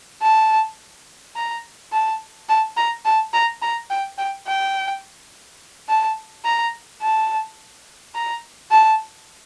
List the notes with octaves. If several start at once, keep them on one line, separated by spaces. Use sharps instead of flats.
A5
A#5
A5
A5
A#5
A5
A#5
A#5
G5
G5
G5
A5
A#5
A5
A#5
A5